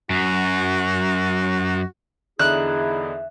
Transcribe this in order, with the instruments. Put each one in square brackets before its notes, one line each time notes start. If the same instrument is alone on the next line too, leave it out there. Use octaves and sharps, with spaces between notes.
[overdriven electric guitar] F#2 [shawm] F#4
[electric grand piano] E2 D3 D5 [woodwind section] D#4 E4 G#4 [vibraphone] E5 [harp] F#6